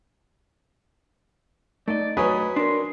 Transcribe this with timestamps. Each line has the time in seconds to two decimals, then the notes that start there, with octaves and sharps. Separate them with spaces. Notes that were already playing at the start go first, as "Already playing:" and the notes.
1.88 A3 D#4 D5 D#5
2.17 F#3 B4 C#5 G#5 B5 D#6
2.56 D4 A#4 C6